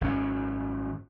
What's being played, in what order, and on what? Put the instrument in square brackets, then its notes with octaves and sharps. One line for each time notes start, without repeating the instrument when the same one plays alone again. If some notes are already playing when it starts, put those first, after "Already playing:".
[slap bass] G#1 F#2 C#4